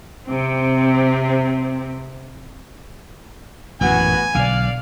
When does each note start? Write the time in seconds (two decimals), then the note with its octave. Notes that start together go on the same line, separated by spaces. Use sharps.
0.28 C3 C4
3.81 A1 F#2 A#2 B3 F#4 G#5
4.35 B1 D3 D5 F5